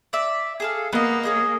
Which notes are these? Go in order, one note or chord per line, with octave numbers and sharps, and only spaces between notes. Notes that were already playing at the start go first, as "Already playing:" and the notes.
D5 E5
G#4 A4 F5
A#3 B3 D#5
C#4 G#4 D#5